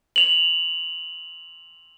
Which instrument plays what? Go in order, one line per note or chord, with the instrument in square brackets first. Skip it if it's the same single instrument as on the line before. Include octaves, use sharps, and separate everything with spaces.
[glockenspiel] F7 F#7